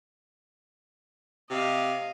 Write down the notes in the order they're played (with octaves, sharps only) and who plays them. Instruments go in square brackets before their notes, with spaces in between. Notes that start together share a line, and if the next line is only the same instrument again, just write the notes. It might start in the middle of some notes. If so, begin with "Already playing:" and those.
[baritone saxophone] C3 [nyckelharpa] D#5 F5